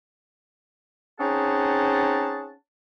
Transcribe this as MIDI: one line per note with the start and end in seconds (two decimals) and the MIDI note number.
1.19 2.52 60
1.19 2.52 61
1.19 2.52 63
1.19 2.52 68
1.19 2.52 78
1.19 2.52 81